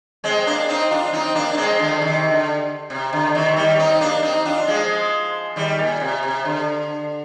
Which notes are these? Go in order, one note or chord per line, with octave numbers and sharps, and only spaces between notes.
G#3 C4
A#3 D4
C4 D#4
D4 F4
C4 D#4
A#3 D4
D4
G#3 C4
D3 F3
C3 D#3
D3
C3
D3
C3 D#3
D#3 G3
C4 D#4
A#3 D4
C4 D#4
D4 F4
F3 G#3
D#3 G3
A#2
C3
C3
D3